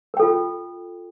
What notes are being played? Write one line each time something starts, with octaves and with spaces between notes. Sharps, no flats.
F4 A4 A#4 G5